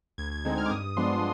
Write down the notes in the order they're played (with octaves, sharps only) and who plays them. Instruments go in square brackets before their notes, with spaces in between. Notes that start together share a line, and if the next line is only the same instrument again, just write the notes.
[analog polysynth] D2 G#6
G#6
D3 G#3 C4 D#4 G#6
F6
D6
G2 D#6
F3 G#3 B3 D4 C6